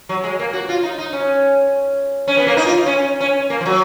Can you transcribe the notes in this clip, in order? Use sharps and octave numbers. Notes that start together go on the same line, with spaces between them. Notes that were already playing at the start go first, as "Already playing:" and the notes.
F#3
G#3
A#3
F#4
F4
D#4
D#4
C#4
C#4
B3
A#3
D#4
F4
C#4
C#4
A#3
F3
F#3